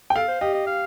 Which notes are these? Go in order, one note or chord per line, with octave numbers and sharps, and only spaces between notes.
G5
A4 F5
C5
G4 D#5
D#5
F5